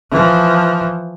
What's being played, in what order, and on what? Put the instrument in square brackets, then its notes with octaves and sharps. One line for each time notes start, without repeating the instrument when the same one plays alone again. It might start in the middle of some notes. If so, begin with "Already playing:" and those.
[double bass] E3 F3